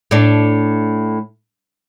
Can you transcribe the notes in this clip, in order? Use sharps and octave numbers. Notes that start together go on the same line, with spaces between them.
A2 D4